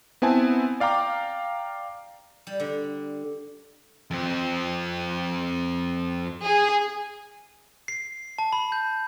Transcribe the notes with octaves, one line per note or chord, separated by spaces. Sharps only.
B3 C4 E4 G#5 A5
D5 F5 G5 A#5 D6
G3
D3
F2 C4
G#4
C7
A5
B5
G6